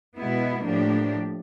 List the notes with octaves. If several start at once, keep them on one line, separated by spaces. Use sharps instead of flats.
B2 G#3 B3 E4
A2 F3 A#3 D4 G4